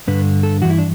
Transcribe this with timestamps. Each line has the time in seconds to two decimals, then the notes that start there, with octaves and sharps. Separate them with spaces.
0.07 G2 D3 B4
0.43 A4
0.62 G2 E3 F#4
0.70 E4
0.78 D4